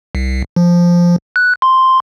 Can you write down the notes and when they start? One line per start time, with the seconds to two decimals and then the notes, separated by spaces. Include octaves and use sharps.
0.15 C2
0.56 F3
1.36 F#6
1.62 C6